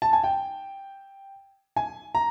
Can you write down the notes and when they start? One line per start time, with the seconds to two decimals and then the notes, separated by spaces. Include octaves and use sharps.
0.02 A5
0.13 G#5
0.24 G5
1.76 G#5
2.15 A#5